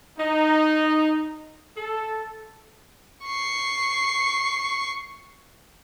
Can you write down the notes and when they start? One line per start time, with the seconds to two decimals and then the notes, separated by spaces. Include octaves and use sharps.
0.18 D#4
1.77 A4
3.26 C#6 C7